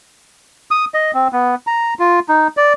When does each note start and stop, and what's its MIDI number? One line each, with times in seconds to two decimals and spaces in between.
0.71 0.85 87
0.94 1.11 75
1.14 1.28 60
1.33 1.55 59
1.67 1.94 82
1.99 2.20 65
2.29 2.48 63
2.57 2.73 74